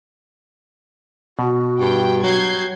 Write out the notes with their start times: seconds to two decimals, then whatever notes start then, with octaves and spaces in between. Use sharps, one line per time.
1.39 B2 F#4
1.80 G2 G5
2.23 F#3 G6 G#6 C7